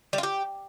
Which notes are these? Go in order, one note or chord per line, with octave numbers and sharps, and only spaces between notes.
G3
F4
G4